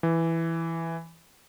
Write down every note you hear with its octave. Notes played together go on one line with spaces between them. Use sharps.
E3